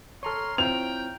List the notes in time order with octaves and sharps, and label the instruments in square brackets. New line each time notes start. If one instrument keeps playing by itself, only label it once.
[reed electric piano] A4 C#6 [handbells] C#5 A#5 F6 [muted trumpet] C6
[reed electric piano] C4 E4 F4 [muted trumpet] G5 [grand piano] F7